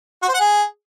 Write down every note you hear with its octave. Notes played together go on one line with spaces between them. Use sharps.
F#4
C5
F#5
G#4